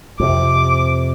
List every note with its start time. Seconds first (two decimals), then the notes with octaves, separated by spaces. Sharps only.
0.20 F2 C3 D6